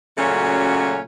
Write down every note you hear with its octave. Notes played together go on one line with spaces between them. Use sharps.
A#2 C#3 F#3 A3 C#4 F#4